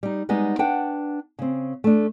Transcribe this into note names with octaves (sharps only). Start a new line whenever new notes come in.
G3 D#4
G3 G#3 B3 D#4
D4 B4 F#5 G5
C#3 C4
A3 D4